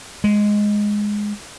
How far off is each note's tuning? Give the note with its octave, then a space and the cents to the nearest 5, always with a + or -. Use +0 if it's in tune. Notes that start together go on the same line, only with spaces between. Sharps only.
G#3 +0